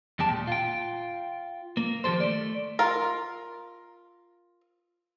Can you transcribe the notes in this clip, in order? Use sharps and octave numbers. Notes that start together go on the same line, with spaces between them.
E2 G#3 G4 A5
A#2
F4 G5
A#3
D#3 F3 G4 A4 C5
A3 D5
F4 A#4